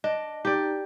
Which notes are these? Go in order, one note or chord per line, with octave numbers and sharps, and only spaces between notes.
D4 D#5
D#4 G4 D5